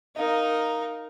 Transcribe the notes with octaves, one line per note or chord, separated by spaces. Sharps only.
D#4 A#4 D#5 F5